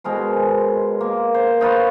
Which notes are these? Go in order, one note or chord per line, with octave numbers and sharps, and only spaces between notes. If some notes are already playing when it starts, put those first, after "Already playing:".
B2 G#3 A#4 C5
A#3
C5
D#4 F4 B4 C#5